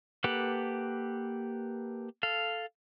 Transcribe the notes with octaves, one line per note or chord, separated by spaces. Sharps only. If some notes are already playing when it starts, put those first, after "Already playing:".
A#3 G4 A4 B4 F#5
A4 F5